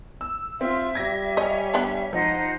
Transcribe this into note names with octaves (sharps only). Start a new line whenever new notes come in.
E6
C4 F4 E5
G3 G#6 A#6
C#5 D#5 G#5
B3 D4
F3 D#4 C5 D#5 F#5